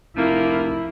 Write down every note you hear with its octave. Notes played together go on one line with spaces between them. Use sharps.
F1 A#2 F3 A#3 E4